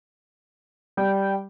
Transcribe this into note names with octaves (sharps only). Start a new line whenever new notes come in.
G3 G5